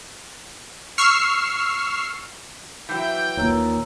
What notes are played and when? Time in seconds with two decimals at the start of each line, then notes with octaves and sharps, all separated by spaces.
0.98 C#6 E6 F6 C7
2.89 E3 F#3 G5 G6
3.37 D#2 A#2 C#5 A#5 E6